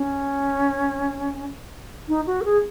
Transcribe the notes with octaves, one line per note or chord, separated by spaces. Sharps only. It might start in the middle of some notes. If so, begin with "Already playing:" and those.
Already playing: C#4
D#4
F#4
A#4
G#4